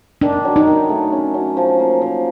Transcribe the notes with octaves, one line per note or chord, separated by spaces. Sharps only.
D#3 D4
F#3
D#4
D#3
A3
C#4
F#3
F3
A#3
F3